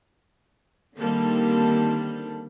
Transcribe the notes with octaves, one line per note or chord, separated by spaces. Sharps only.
D3 D#3 G3 A#3 C4 A4